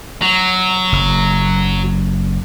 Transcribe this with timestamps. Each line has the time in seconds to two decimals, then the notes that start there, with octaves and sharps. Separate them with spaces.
0.22 F#3
0.92 F#1